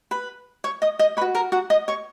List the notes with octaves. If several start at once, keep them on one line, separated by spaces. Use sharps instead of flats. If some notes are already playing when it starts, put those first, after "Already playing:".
B4 B5
C#5 C#6
D#5 D#6
D#5 D#6
B4 C#5 B5
F#4
A#4 A#5
F#4 F#5
D#5 D#6
C#5 C#6